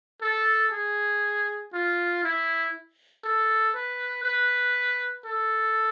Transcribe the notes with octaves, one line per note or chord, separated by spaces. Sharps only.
A4
G#4
F4
E4
A4
B4
B4
A4